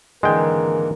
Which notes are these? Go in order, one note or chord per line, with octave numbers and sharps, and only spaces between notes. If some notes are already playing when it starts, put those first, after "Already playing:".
G#1 D3 E3 G#3 A#3 A#4 G5